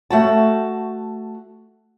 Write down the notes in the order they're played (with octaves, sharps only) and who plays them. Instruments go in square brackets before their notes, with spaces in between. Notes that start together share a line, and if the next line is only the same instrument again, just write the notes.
[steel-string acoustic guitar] A3 F#4 A5